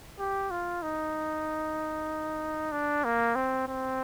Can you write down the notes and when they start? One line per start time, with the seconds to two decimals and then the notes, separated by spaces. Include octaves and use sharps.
0.20 G4
0.51 F4
0.83 D#4
2.72 D4
3.04 A#3
3.35 C4
3.68 C4